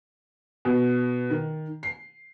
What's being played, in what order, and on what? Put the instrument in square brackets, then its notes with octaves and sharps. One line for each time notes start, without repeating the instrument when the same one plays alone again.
[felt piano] B2
D#3
C7